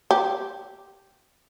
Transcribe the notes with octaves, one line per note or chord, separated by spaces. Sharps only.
G4